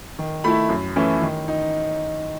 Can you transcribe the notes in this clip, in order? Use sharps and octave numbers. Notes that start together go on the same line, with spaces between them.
D#3
A3 E4 B5
F#2
E3 A3 C#4 E4
D#3
D#4